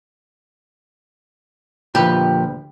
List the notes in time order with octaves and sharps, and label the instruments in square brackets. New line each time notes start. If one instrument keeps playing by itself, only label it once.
[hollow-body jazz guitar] D2 B4 [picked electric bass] A#2 F3 [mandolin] G4